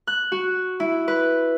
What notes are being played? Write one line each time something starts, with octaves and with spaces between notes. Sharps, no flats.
F#6
F#4
E4
B4